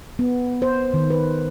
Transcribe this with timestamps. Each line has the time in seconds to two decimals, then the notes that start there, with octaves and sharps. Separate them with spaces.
0.19 B3
0.62 C5
0.94 D#3
1.10 B4